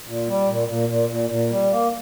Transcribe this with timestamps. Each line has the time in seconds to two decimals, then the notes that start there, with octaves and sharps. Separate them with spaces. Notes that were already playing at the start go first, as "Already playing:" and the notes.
0.07 A#2
0.28 G3
0.48 A#2
0.68 A#2
0.89 A#2
1.10 A#2
1.30 A#2
1.50 G3
1.71 A#3